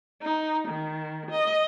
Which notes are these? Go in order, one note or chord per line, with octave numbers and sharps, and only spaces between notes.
D#4
D#3
D#5